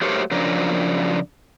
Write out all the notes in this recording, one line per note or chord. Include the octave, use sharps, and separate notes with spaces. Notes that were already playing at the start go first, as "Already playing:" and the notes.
F#3 A3 G4 A#4 C5 C#5
C#3 F3 F#3 D4 A#4